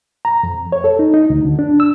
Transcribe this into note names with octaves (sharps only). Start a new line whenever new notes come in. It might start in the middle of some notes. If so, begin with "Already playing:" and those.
A#5
F2
C#5
A4
D#4
D#4
D2
D3
D4
E6